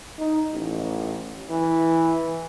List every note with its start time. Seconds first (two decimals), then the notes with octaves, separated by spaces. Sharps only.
0.19 D#4
0.52 A1
1.50 E3